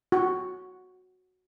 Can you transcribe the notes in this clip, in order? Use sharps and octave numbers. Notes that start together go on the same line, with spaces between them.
F#4